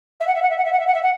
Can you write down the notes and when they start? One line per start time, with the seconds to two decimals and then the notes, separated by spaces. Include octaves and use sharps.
0.20 E5
0.27 F#5
0.35 E5
0.42 F#5
0.50 E5
0.57 F#5
0.64 E5
0.72 F#5
0.79 E5
0.87 F#5
0.94 E5
1.02 F#5